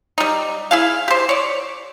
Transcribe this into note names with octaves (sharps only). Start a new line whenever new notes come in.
G3 D#4
E4 G#4 F5
G4 C5
C#5 D5